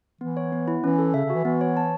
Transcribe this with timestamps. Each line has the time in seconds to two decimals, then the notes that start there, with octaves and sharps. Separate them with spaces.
0.21 E3 B3
0.37 C#5
0.52 B3
0.68 E4
0.83 E3 C#4
0.98 A4
1.14 C#3 E5
1.25 C#3
1.30 E3 F#4
1.45 E3 B3
1.61 C#5
1.77 A5